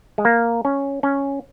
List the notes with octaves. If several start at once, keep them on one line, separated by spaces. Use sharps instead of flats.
G#3
A#3
C#4
C#4